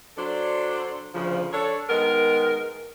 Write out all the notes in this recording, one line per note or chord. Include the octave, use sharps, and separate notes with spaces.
F#3 D4 A4 C5 D5
D2 C#3 F3
D4 A4 C#5
D#3 G#3 B3 A#4